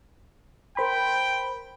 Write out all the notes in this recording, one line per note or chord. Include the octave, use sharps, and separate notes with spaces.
A#4 C5 G5 B5